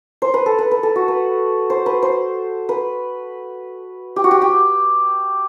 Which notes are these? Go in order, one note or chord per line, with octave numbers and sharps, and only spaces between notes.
C5
B4
A4
B4
B4
A4
F#4
B4
C5
B4
C5
B4
G4
F#4
G4
G4